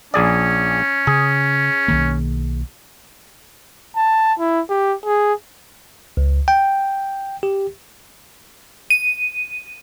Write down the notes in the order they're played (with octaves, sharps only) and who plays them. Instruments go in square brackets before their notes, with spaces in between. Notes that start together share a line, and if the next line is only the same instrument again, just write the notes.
[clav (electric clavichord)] A#1 G#4 D5 [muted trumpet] C#4
[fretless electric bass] C#3 [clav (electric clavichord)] G#4
[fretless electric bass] B1 D#3 A#3
[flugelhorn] A5
E4
G4
G#4
[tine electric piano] C#2
G5
G4
[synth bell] D#7